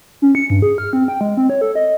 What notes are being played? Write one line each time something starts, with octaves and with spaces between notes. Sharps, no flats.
C#4
C#7
G2
G#4
F6
C4
G5
G#3
C4
C#5
A4
D#5